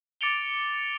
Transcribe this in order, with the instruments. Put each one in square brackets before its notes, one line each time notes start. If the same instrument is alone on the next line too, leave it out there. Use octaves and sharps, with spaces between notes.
[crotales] D6 A6 C#7 D7 F7 G7